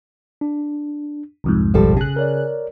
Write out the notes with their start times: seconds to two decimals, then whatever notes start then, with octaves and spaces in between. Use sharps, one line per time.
0.41 D4
1.44 C2 F2 G#2
1.74 A1 B2 F3 G3 A4 A5
1.96 C#3 G#4 F#6
2.16 A#4 C#5 D5